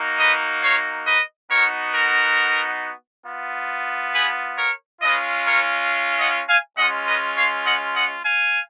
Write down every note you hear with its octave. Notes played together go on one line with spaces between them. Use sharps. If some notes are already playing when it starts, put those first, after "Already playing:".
Already playing: A#3 D#4 F#4
B4 D#5
C#5 F5
B4 D#5
B3 D#4 F#4 A#4 C#5
A#4
B3 F4
G#4 B4
A#4 C#5
G#3 C#4 F4 B4 D#5
A#4 C#5
D#5 F#5
F5 G#5
G#3 C#4 F4 D#5 F#5
B4 D#5
C#5 F5
D#5 F#5
D#5 F#5
F5 G#5